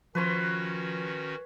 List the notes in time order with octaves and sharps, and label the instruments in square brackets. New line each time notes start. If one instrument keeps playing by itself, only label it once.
[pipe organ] D#3 C#4 F#4 [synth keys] F3 [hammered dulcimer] B4 C#5 C6